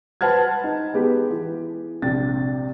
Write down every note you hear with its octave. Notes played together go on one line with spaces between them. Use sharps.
B4 C5 F#5 A5 F6 G#6
D#4
G#3 B3 G4
E3
A#1 C3 A6